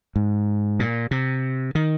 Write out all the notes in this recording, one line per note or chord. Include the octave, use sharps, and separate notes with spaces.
G#2
A#2
C3
D#3